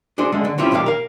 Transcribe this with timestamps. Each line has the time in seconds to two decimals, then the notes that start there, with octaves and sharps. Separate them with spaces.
0.18 D4 F#4 G#4 C5
0.32 D3 G#3 A3 C#4
0.45 D3
0.58 C4 C#4 E4 F4 G4 G5
0.71 B1 A#2 D#3 D4 G4 F5
0.86 A#4 F5